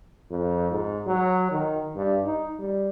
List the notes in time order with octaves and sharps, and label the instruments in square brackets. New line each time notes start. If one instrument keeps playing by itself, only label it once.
[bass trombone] F2
G#2
F#3
D#3
G2
D#4
G3